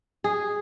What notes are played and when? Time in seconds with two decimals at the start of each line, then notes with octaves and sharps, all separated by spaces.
0.24 G#4